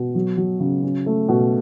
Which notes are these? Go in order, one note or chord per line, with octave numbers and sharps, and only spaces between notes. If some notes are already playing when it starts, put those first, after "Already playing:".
Already playing: B2
F#3
F#3
C#3
C#4
A3
B2